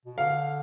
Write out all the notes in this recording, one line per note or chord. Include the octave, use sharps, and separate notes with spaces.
B2
D3 F5